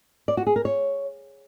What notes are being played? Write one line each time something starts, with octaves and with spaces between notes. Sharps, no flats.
D5
F#4
G#4
A#4
C#5